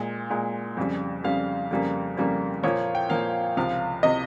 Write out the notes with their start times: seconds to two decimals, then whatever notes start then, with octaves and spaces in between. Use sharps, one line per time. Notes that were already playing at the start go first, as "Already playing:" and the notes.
Already playing: A#2 G#3
0.30 A#2 G#3
0.77 F2 C#3 G3
1.24 F2 C#3 G3 F5
1.71 F2 C#3 G3 A#3
2.17 F2 C#3 G3 A#3
2.63 A#2 F3 A#3 C#5
2.95 G5
3.10 A#2 F3 A#3 F5
3.57 C#2 C3 F3 F5
4.03 C3 F3 D#5